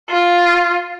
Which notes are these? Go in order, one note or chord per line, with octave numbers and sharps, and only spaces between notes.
F4